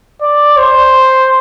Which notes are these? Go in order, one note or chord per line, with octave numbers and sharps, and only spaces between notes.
D5
C5